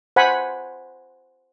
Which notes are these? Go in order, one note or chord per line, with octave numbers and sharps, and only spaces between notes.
C5 F#5 G#5 B5